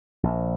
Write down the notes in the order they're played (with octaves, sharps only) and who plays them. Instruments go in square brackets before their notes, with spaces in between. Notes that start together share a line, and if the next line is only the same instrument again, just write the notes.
[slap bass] A#1